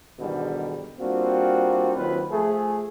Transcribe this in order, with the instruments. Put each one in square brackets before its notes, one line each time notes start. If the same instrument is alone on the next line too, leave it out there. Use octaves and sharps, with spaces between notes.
[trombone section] E2 G#2 B2 D3 D#3 G3
G3 A#3 C4 D4 F4 F#4
D#2 F#3 C4 F4 B4
F3 A3 G#4